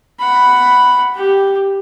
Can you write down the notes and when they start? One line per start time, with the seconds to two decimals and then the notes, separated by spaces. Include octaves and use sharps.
0.19 F#5 B5
1.15 G4